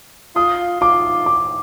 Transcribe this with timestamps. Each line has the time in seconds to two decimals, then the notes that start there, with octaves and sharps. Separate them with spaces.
0.36 F4 D#6
0.81 F4 D6
1.26 D6